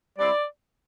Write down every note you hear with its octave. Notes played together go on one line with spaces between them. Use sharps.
G3 C4 E4 D5